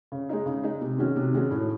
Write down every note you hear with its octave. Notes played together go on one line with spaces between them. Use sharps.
C#3
G#3 D#4
C#3
G#3 D#4
C3
D#3 G#3 C#4 F#4
C3
D#3 G#3 C#4 F#4
A2